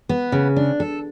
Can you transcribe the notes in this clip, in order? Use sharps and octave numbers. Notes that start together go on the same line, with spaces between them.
B3
C#3
D4
A4